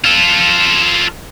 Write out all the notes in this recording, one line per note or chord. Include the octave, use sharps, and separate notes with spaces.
F4 A4